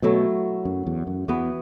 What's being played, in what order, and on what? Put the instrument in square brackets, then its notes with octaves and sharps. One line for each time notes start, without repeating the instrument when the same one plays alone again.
[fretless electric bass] B2 [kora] F#3 A3 E4
[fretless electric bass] F#2
E2
F#2
[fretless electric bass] E2 [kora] E3 B3 F#4